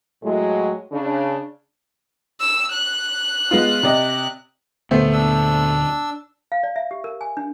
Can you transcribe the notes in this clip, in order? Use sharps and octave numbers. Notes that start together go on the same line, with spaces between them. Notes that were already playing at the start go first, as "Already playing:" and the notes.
A2 F#3 G#3
C#3 D4
E6
F#6
G#3 B3 F4
C3 D5 D#5
D2 A#2 D3 A3 B3 C5
D4 E6
F5
D5
E5
G4
A#4
G#5
D4